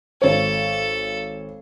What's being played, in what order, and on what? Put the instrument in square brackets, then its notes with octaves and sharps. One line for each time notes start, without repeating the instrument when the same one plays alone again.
[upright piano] G#1 C#5 [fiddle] A4